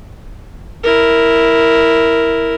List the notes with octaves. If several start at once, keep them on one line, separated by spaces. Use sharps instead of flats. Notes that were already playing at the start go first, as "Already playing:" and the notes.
E4 A#4